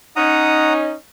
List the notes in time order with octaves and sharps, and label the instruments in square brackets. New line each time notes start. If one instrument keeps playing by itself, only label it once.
[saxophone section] C#4 D#4 [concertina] F#5 A#5 D#6